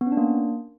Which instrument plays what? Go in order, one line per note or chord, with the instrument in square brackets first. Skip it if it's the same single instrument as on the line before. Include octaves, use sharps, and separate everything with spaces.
[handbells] B3
C#4
D4
A#3